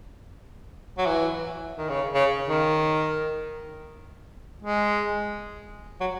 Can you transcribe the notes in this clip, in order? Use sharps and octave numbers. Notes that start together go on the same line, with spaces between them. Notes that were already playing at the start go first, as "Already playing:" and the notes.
F#3
E3
D#3
C#3
C#3
D#3
G#3
F#3